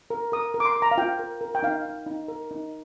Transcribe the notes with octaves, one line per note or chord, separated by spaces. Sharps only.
A#4
A#4 D#6
A#4
D6
C6
A#4
A#5
F5
F4 G5
A#4
A#4
G5
D#4 F5
D#4
D#4
A#4
D#4